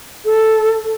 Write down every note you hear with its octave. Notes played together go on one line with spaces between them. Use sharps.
A4